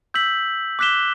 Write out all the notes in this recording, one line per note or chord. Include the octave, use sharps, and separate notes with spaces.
E6 G6 B6 F#7
D6 F#6 B6 E7 G7